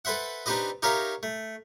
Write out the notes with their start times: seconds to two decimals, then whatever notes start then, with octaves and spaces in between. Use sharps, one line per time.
0.05 A4 B4 C5 E5 F#5
0.46 C4 D4 D#4 G4 B4 D#5
0.82 D#4 G4 A#4 C#5 E5 F5
1.23 A3